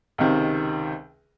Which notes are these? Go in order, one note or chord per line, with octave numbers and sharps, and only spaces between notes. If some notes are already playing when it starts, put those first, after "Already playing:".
C#2 C3 D#3